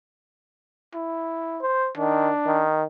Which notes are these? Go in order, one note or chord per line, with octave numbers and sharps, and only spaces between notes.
E4
C5
D#3 D4
D#3